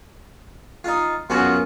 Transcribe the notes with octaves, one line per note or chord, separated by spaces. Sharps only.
D#4 F4
F#2 B3 F4 F#4 G#4